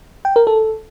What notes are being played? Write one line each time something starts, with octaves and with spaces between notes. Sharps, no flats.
G5
A#4
A4